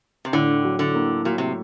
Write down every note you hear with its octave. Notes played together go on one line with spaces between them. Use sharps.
C3
A2 D3
F#3
D3
A#3
A#2 F#3
C3